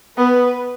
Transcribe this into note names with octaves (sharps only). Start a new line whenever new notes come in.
B3 B4